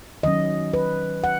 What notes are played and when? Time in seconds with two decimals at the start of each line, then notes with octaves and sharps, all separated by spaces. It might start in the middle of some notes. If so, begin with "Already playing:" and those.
0.23 D#3 F#3 C#4 D#5
0.74 B4
1.24 F#5